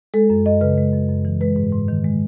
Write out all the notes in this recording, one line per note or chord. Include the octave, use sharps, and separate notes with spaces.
G#3 A4
F#2
F#2 D#5
C#3 B4
G#3
F#2
F#2
E3
G#3 B4
G#2
G#2
D#3
G#3